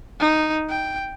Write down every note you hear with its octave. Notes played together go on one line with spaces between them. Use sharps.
D#4
G5